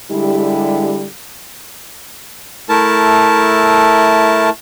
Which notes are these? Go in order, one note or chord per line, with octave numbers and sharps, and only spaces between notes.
D3 G3 G#3 E4 G4
A3 E4 A#4 A5